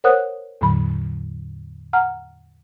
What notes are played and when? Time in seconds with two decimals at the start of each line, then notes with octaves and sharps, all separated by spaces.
0.04 A#4 C5 C#5 F#5 D#6 F#6
0.61 E2 A2 D3 F#3 B5
1.93 F#5 A#5 F6